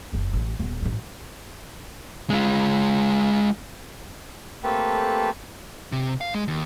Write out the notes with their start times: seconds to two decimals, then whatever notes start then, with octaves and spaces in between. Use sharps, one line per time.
0.13 F#1 E2
0.33 A1
0.59 D#1 B3
0.82 A1 G2
2.30 G#3 F4
4.64 A3 A#3 C4 G4 A4 B4
5.92 C3
6.21 F5
6.34 G#3
6.48 D#2